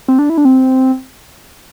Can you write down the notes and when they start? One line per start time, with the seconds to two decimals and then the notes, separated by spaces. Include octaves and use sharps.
0.08 C4
0.19 D4
0.30 E4
0.38 D4
0.45 C4